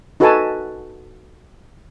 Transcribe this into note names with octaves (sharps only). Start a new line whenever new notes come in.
D#4 F#4 A4 B4 G#5 A5